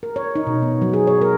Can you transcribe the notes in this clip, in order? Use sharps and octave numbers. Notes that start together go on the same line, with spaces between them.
A#4
C#5
D#4
B2
B3
F#3
G#4
C#5
A#4